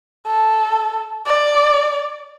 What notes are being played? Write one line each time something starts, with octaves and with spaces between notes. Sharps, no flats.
A4
D5